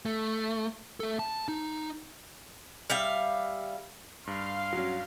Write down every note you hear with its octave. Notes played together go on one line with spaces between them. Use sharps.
A3
A3 A4
A5
D#4
G3 E5 F5
G2 F5 C6
F#3 C#4